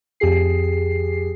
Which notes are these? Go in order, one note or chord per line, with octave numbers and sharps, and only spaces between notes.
F2 G4 G#4 C7